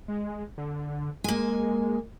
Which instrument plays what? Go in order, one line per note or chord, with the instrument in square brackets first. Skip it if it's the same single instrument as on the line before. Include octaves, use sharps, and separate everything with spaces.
[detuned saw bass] G#3
D3
[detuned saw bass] G#3 [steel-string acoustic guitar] A#3 G#5